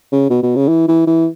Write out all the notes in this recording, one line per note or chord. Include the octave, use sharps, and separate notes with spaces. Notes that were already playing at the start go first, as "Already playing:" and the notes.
C#3
B2
B2
C#3
E3
E3
E3